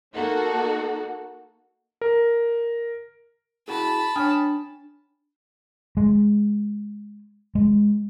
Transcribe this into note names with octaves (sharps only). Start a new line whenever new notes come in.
A#3 D#4 F#4 A4
A#4
E4 F#4 G#4 A5 B5
D4 C#5 G5 G#5 D#6 F6
G#3
G#3